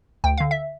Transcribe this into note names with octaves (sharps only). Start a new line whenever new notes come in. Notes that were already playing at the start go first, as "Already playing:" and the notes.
D2 G5
D3 F5
E5